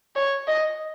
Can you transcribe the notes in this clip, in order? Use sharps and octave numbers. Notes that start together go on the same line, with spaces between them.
C#5
D#5